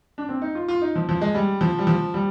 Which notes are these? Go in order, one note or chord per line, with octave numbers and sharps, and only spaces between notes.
D4
C4
D#4
F4
F4
D#4
F3
F3
G#3
G3
F3
G3
F3
G3